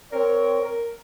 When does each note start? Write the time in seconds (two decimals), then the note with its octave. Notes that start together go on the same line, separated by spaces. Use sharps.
0.11 C4 A#4 C#5
0.63 A#4